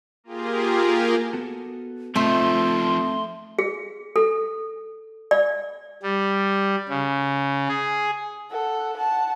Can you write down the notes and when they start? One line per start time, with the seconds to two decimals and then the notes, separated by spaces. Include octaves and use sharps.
0.24 A#3 F4 G4 G#4 A#4
1.33 B3 F#4 A4
2.16 F3 A3 C4 D#4 C6
3.59 G#4
4.16 A4
5.31 D5
6.03 G3
6.89 C#3
7.69 G#4
8.51 A4 F#5
8.97 F#5 A5